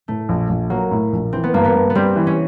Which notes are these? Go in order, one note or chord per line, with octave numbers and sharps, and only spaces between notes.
A2 A3
A#1
A#1
F#3 A#3
A2
A#1
E3 C4
B3
G2 A#3
B3
G2
B3
G3 C4
E3
C#4